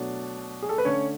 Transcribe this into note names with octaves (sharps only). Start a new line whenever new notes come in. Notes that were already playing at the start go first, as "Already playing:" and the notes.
Already playing: B2 F#3 A3 D4
G#4
A4
B4
D3 A3 C#4 C#5